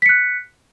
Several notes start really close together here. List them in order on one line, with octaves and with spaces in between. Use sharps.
B6 C#7 F#6